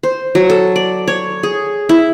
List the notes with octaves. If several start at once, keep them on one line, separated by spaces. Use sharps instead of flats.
C5
F#3
A4
D5
C#5
G#4
E4